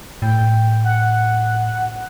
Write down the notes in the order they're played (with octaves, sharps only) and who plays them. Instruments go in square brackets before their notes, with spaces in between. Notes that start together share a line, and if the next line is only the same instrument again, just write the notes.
[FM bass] A2 [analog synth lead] G5
[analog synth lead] F#5